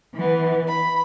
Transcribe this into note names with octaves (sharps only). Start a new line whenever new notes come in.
E3 B3
B5